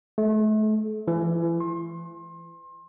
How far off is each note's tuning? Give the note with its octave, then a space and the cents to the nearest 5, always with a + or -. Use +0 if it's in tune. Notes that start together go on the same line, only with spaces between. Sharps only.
A3 -35
E3 +30
C6 +30